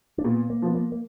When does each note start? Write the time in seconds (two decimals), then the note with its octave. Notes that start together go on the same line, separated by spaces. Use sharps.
0.18 D4
0.24 A#2 B3
0.50 A#3
0.62 F3 B3
0.75 A#3
0.92 A#3